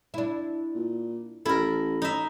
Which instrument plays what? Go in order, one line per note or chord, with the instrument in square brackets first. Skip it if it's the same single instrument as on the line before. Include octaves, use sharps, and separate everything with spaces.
[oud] D4 E4
[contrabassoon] A#2
[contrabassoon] A1 [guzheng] E4 A#4 [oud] A4
[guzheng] D#4 E5